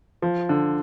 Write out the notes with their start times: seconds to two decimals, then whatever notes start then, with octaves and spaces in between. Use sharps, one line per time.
0.22 F3
0.49 D3